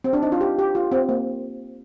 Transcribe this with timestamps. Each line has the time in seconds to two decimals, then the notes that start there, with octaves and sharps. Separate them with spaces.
0.04 C4
0.13 D4
0.23 D#4
0.32 F4
0.41 G4
0.59 G4
0.75 F4
0.92 C4
1.09 A#3